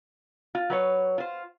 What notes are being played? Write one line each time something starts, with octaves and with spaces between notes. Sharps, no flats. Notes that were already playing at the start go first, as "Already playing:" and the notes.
F4
F#3 B4 C#5
F4 C5